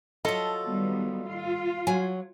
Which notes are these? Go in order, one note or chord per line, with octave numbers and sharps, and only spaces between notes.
F#3 F4 A4 D#5 A5
D#3 G3 B3
F4
F#3 G#5